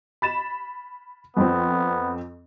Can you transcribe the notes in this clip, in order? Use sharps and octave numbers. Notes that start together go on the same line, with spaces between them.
B5 A6 E7
F2 F3 B3 C4